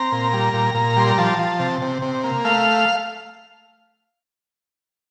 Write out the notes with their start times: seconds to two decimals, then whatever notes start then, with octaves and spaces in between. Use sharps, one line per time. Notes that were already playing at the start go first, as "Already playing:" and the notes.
Already playing: C4 A#5
0.12 A#2
0.33 G3
0.54 A#2
0.75 A#2
0.97 G3 C6
1.08 A#5
1.18 F3 A5
1.39 F3
1.59 C3
1.81 C3
2.02 C3
2.24 A#3
2.45 A3 F5